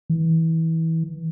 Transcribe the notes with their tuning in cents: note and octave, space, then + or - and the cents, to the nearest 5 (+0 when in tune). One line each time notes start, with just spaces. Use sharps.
E3 -25